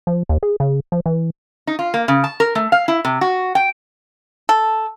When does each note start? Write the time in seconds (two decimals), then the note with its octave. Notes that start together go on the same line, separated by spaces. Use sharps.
0.07 F3
0.29 D#2
0.43 G#4
0.60 C#3
0.92 F3
1.06 E3
1.67 D#4
1.79 F4
1.94 A#3
2.08 C#3
2.24 A5
2.40 A#4
2.55 A3
2.72 F5
2.88 E4
3.05 C3
3.21 F#4
3.55 G5
4.49 A4